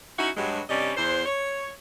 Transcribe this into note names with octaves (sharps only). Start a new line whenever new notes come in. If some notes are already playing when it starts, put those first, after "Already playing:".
C#4 D#4 E4 F#4
G2 F#3 G#3
G2 C3 G3 C#4 D5 D#5
E2 C5
C#5